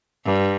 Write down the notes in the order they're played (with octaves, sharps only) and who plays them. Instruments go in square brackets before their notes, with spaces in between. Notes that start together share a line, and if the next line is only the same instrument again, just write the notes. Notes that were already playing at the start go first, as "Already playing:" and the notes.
[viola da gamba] G2